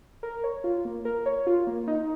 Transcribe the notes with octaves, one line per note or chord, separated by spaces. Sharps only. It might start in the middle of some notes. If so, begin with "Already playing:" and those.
A#4
C#5
F4
A#3
A#4
C#5
F4
A#3
D#4